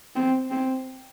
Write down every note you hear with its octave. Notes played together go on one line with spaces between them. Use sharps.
C4
C4